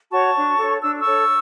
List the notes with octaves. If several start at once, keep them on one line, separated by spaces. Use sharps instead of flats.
F#4 C#5 A5 C#6
D4
A4 C#5
D4 E6
A4 C#5 C#6 E6